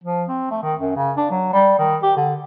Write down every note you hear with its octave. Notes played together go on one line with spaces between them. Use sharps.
F3
C4
A3
D#3
F#2
C#3
D4
F#3
G3
D#3
G4
D3